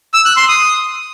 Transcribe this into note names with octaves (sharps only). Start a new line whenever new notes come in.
E6
F#6
C6
D#6